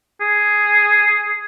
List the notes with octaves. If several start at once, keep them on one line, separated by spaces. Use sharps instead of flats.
G#4